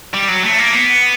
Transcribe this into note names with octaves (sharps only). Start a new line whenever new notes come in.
G3
F#3
A3
A#3
B3